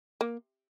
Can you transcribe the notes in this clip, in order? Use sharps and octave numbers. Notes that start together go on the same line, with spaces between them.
A#3